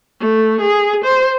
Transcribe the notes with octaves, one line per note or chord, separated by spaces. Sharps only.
A3
G#4
C5